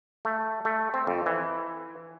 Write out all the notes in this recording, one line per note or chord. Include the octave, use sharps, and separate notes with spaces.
A3
A3
C4
F2
E3